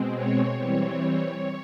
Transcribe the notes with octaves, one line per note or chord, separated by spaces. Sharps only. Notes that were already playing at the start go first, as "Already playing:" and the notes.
Already playing: B2 G#3 C4
C#5
E3 G3 C4 C#5